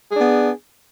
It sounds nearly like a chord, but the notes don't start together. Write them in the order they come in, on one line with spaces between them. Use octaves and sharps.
G#4 D4 B3